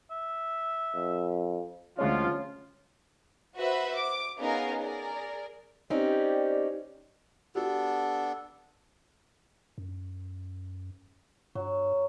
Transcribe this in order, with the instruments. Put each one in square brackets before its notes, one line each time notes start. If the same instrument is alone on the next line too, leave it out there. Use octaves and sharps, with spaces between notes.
[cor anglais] E5
[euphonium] F2
[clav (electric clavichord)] D2 G#3 C#5 [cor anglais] F3 [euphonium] C#4 [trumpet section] F4
[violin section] F#4 B4 C5 E5 B5
D6
B3 C#4 D#4 G#4 A#4 F5
G#4 A#4 D5
[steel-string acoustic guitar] C4 C#4 D#4 [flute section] G4 D5
[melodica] B3 D4 A4 [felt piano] F#4 G4
[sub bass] F#2
[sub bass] G2 [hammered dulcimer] F#3